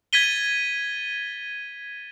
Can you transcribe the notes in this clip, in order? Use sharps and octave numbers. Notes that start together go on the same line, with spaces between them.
G#6 A6 B6 D#7 G7